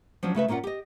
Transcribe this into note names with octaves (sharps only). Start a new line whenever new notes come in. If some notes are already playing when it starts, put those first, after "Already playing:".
F3 F#3 C#4 D4
C#3 A3 B4 E5
A#2 A#3 C#4 F4 F#5
G4 D#5